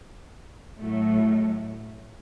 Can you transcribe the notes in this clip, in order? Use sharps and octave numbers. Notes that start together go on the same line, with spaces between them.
A2 F#3 A3